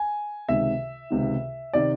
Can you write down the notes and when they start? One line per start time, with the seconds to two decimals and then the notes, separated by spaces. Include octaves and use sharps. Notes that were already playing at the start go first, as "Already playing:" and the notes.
Already playing: G#5
0.49 C#2 C3 D#3 E5
1.10 C#2 C3 D#3
1.73 C3 D#3 D5